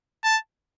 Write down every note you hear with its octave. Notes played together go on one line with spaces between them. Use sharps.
A5